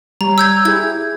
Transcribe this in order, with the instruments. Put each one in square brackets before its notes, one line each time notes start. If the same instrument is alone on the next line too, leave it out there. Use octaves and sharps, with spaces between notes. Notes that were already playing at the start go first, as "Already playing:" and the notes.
[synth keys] G3 C#5 [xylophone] A#5
[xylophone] E6 G6 G#6
[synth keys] E4 G4 G#4 [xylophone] G6 G#6